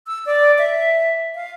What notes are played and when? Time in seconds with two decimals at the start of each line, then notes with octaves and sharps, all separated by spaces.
0.07 E6
0.26 D5
0.59 E5
1.35 F5